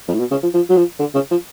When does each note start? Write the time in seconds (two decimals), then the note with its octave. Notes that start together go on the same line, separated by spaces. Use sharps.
0.08 F2
0.14 A2
0.19 B2
0.31 C#3
0.43 F3
0.54 F3
0.69 F#3
0.77 F3
1.00 D3
1.14 C#3
1.31 F3